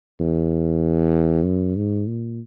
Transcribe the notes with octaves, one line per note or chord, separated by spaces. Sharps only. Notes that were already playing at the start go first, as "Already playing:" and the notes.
E2
F#2
G#2
A#2